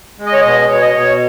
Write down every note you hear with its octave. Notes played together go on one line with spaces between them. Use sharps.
G#3
D#5
C#5
B2 D#5
B2 C#5
D#5
B2 C#5